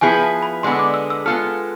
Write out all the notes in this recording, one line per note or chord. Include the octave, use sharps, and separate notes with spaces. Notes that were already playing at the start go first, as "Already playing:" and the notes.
F3 B3 E4 G#4 B4 G#5
A5
B5
D3 G#3 B3 D4 C6
E6
D6
E6
E6
G#3 B3 F4 A4 F6